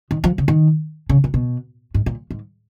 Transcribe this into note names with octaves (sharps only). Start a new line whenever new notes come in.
D#3
F3
C#3
D#3
C#3
A#2
B2
G#2
A#2
G#2